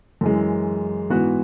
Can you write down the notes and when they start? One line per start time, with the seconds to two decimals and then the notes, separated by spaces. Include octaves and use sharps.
0.21 F#2 E3 G#3
1.10 G#2 E3 B3 F#4